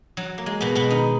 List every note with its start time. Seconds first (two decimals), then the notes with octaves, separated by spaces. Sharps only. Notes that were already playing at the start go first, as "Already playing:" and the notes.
0.17 F#3
0.38 A#3
0.46 G#3
0.61 B2 B3
0.75 B2 B3
0.90 D#3 D#4